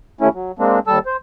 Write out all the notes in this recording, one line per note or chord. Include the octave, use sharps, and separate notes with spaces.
D#2 A3 C#4 E4
F#3
G#3 A#3 C4 D4
D#2 G3 A4 A5 E6
C5